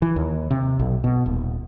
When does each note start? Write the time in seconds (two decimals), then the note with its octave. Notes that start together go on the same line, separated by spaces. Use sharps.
0.02 E3
0.16 D#2
0.51 C3
0.79 B1
1.04 B2
1.26 D#1